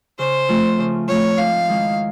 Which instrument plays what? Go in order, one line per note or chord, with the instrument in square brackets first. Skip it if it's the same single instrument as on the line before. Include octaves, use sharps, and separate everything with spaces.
[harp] C#3 [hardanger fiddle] C5
[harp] F3 A3 C4 F4
C#3
[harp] F3 A3 C4 F4 [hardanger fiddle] C#5
[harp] G#2 [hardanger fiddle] F5
[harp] D#3 G#3 C#4 E4